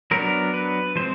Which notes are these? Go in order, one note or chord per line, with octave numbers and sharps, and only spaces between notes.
F#3 B3 D4 A#4
B4
F3 G#3 C4 C5